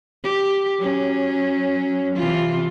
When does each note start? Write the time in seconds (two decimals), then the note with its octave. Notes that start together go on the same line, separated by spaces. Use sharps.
0.24 G4
0.78 F#3 C#4
2.15 C3 E3 F4